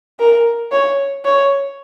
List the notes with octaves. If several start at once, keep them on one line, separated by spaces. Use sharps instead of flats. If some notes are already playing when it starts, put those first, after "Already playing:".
A#4
C#5
C#5